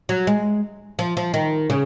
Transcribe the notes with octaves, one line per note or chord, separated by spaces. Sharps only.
F#3
G#3
F3
F3
D#3
C#3